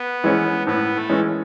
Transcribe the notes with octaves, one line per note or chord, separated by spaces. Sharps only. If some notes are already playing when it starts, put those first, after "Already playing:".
Already playing: B3
E3 G#3 C#4
A2 B3
A3
E3 G#3 C#4